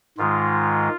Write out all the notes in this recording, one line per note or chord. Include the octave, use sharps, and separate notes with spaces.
G#2 D#3 G#3 F4